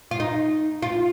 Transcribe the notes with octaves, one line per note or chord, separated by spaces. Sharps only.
F4
D#4
F4